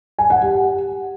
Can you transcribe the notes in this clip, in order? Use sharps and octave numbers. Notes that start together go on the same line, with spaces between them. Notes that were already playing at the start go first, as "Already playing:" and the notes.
G#5
F#5
G4